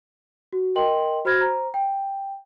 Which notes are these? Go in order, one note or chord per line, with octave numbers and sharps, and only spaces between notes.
F#4
A#4 D#5 G5 C6 F#7
F#4 C5 B5 F6 G#6 A#6
C5 A#5
G5